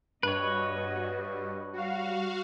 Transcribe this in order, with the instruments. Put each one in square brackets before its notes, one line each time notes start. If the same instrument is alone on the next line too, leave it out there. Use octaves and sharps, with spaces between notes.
[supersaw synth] G2 [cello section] F#4 D#5 [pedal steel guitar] B4 C#5
[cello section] G3 [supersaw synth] F#4 F5